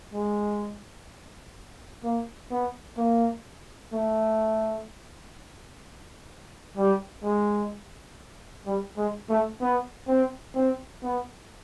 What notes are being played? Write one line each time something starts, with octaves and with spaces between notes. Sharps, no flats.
G#3
A#3
B3
A#3
A3
G3
G#3
G3
G#3
A3
B3
C4
C4
B3